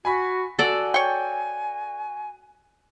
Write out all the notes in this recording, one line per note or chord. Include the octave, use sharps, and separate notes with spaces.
F#4 G#5 B5 B6
F#4 A4 D5 F#5 G#5
C#5 G5